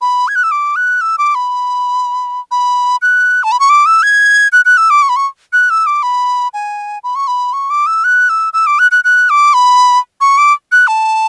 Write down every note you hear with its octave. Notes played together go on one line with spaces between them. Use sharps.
B5
G#6
F#6
E6
D6
F#6
E6
D6
B5
B5
F#6
A5
B5
C#6
D6
E6
G#6
F#6
F#6
E6
D6
C#6
B5
C#6
F#6
E6
D6
B5
G#5
B5
C#6
B5
C#6
D6
E6
F#6
E6
E6
D6
F#6
F#6
F#6
D6
B5
C#6
D6
F#6
A5